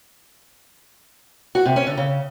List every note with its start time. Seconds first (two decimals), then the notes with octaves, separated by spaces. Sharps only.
1.55 F#4
1.66 C3
1.76 C#4
1.87 D3
1.97 C#3